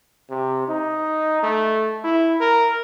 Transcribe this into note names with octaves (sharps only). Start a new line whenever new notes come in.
C3
D#4
A3
E4
A#4